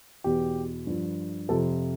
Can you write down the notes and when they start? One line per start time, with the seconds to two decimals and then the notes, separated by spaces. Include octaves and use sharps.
0.24 E2 B2 G4
0.87 G2 F3
1.49 F2 C3 F3 A4